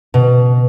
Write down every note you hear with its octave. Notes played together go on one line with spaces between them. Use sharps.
B2